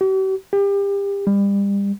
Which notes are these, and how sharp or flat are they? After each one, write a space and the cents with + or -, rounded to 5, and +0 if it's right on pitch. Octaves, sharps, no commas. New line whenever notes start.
G4 -45
G4 +30
G3 +30